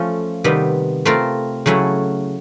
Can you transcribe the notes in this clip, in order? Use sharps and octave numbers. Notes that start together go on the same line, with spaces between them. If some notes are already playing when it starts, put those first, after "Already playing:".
Already playing: F3 A3 C#4 F4
C3 D#3 G3 B3
A3 C4 F4 A#4
C#3 F#3 A3 C#4 E4